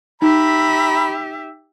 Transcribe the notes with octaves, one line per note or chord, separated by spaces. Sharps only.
D#4 G4 E5 A#5 B5